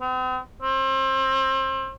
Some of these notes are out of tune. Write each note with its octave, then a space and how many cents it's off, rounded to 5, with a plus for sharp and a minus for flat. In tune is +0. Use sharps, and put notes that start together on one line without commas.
C4 -45
C4 +30